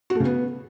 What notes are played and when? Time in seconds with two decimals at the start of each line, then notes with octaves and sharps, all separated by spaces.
0.10 F#4
0.15 A3
0.20 C#3
0.25 B3